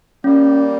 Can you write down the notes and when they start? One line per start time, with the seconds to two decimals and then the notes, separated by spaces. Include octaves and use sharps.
0.24 G3 A#3 C#4